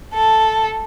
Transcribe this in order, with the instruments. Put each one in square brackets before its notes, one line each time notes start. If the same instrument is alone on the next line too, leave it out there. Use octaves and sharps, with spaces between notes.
[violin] A4